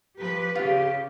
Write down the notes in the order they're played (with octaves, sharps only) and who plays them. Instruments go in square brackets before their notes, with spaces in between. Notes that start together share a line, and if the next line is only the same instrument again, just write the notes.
[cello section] F3 G4 B4
[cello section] C#3 G4 [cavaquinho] F4